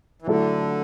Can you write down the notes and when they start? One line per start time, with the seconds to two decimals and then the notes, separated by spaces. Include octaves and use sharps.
0.22 E3
0.27 D3 F#3 A3 E4 A4